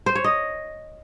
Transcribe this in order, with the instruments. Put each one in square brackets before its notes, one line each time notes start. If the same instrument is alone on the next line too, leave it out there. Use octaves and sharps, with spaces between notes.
[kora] C5
C#5
D#5